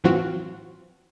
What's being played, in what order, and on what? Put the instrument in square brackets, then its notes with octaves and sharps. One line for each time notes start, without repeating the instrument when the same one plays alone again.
[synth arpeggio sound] A2 E3 F#3 C4 F4 F#4